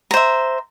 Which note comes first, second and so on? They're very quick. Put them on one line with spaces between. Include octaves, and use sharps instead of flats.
A#5 C5 E5